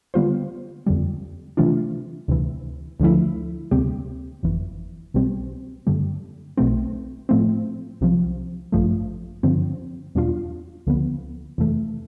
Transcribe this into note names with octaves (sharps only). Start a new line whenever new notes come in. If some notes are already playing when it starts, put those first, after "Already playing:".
D3 G3 B3 F4 C5
F2 D3 G3
C3 E3 A3 D4 F4
D2 C3 E3
D2 D3 F3 A3 E4
D2 C3 G3 C4 G4
G1 F2 E3
C2 B2 G3 C4
G2 D3 G3
B1 B2 A3 C4
A2 F3 A3 C4
C2 C3 F3
A1 G2 F3 A3
G2 D3 F3 C4
E2 B2 G3 D4 F4
D2 D3 F3 B3
F2 C3 E3 A3